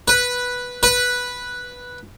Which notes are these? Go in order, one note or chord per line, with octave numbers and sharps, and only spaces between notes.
B4
B4